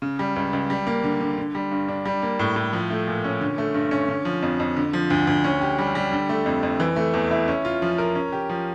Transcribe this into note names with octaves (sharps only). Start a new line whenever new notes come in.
C#3
G3
C#2
C#2
G3
A#3
D3
D3
D3
G3
G2
D4
G3
A#3
A2
A2
F3
A3
A#2
C#4
D3
A3
G2
C#4
D3
F3
F2
F2
D3
F3
D2
D2
C#4
G4
G3
G3
D3
A3
F2
F2
E3
A3
E2
E4
C#4
F4
F3
A#4
C#4
G4
F3